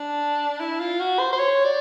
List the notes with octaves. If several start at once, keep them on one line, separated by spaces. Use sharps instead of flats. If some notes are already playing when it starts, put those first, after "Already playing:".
Already playing: D4
E4
F4
F#4
C5
C5
C#5
D5